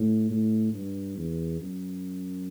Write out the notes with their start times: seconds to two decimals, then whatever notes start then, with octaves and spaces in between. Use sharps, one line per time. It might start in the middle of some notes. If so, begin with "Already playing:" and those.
Already playing: A2
0.30 A2
0.74 G2
1.17 E2
1.61 F#2